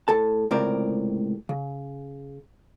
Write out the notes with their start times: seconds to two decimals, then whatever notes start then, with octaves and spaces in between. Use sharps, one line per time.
0.08 A2 A4 A5
0.51 C#2 A2 C3 A#4 C5 D5
1.49 C#3